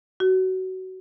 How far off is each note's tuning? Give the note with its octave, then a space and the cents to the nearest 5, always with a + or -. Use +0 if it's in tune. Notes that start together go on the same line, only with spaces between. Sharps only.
F#4 +20